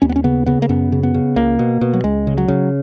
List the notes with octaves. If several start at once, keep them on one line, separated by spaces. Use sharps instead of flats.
D#2 C#4
B3
C#4
C#3 B3
C#3 B3
A#3
F#2 B3
C#3
B3
C#3
C#2 A#3
B2
B2
F#3
C#2 G#3
C#3
F#3
C#3